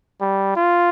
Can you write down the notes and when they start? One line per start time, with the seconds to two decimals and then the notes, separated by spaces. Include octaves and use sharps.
0.21 G3
0.56 F4